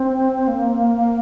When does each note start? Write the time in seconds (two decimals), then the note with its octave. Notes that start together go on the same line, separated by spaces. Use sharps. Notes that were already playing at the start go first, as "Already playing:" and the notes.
Already playing: C4
0.48 A#3